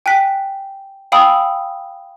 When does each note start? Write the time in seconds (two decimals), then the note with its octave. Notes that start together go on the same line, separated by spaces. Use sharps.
0.06 G5 G#5 F#6 B6
1.12 F5 G5 G#5 B5 D#6 E6